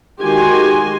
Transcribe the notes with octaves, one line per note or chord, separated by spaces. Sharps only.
D#3 G#3 F#4 G4 G#5 C6